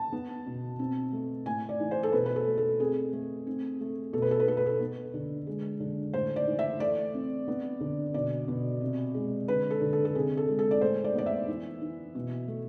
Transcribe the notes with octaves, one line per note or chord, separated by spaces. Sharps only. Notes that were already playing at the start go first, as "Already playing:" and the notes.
Already playing: A5
B3
B2
C4
A3
A2 G#5
D5
E3
C5
A4
B2 B4
B4
A4
A3
A4
C4 G#4
A3
C4
A3
B2 A4
B4
A4
B4
B3 A4
B4
A4
B3
D3
G#3
D3
A2 C5
D5
E3
E5
A3 D5
C4
B3
D3
B2 D5
B2
C3
G#3
D3 B4
A4
D3
A4
A4
C3 G#4
A4
G#3
A4
D5
A2 C5
D5
B3 D5
E5
E3
E3
B2
A3